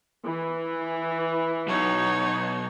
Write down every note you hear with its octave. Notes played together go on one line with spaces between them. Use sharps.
E3
B1 B2 D#4 C#5